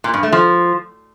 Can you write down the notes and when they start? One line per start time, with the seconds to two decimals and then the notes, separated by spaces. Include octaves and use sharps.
0.04 A#2
0.14 G2
0.23 A3
0.32 F3